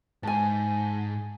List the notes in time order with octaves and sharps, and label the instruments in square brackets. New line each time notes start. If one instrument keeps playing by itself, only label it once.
[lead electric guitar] G#2 [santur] G#5 A5